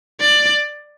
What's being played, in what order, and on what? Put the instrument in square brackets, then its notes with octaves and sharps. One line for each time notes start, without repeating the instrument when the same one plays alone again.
[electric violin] D5